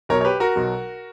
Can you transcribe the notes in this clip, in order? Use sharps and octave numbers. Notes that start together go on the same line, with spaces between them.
B1 B2 F#3 A#4 C#5
C#5
G4 B4
F#4 A#4
B1 B2 F#3